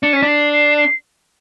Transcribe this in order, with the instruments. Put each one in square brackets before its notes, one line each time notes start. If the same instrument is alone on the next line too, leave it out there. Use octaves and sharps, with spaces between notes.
[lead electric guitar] D4 [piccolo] C#7
[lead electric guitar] C#4 [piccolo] B6
[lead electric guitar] D4
[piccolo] C7
C7
C7